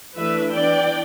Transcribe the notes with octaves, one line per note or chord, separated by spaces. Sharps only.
E3 A3 D4 B4 E5
E3 B3 D4 D5 G5